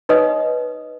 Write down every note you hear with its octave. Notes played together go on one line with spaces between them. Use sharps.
D#4 B4 C#5 D#5 D#6